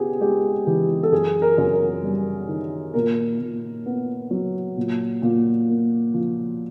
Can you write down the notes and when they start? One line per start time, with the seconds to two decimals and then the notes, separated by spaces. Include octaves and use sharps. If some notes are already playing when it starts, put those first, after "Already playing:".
Already playing: C#3 B3 G4 G#4
0.21 G#3 G4
0.67 E3 G4
1.03 A4
1.12 F#2 G#4
1.42 A#4
1.58 F#2
1.73 A#4
2.03 G3
2.48 D#3
2.94 A#2 A#4
3.39 A#2
3.86 B3
4.31 F#3
4.77 A#2
5.22 A#2
5.68 A#3
6.14 F3